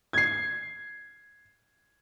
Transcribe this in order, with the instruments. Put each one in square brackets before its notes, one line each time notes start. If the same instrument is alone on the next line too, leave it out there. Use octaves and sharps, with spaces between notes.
[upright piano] G#6 C7